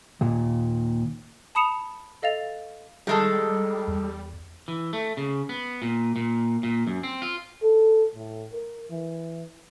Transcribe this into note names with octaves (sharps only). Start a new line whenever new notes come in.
D#2 A#2
A5 B5 D#6 C#7 E7 F7
A4 D#5 F5 A6 F7
D#3 G3 G#3 A4
E2
E3
A3
C#3
B3
A#2
A#2
A#2
F#2
C4
F4
A4
A2
A#4
E3